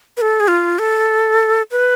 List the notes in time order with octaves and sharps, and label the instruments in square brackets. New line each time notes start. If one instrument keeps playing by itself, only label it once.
[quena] B4
A4
G#4
F4
A4
B4